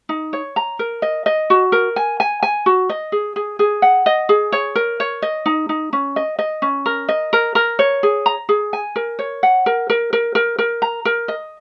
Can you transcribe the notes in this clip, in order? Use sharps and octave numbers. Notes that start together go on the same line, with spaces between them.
D#4
C#5
A#5
A#4
D#5
D#5
F#4
A#4
G#5
G#5
G#5
F#4
D#5
G#4
G#4
G#4
F#5
D#5
G#4
C#5
A#4
C#5
D#5
D#4
D#4
C#4
D#5
D#5
C#4
A#4
D#5
A#4
A#4
C#5
G#4
A#5
G#4
G#5
A#4
C#5
F#5
A#4
A#4
A#4
A#4
A#4
A#5
A#4
D#5